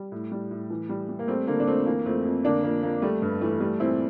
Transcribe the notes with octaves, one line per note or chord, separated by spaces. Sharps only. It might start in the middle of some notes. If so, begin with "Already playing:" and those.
Already playing: G3
A2
G3
A2
E3
G3
G3
A#3
G3 A3 C4
D3 A#3
D4
F2 A3 C4
E3 A#3
F2 A3 C4
F2
D3 A#3 D4
F2 A#3
F2 A#3
G3 A3
G2
E3 A3
G3 A3
A#2 C4 E4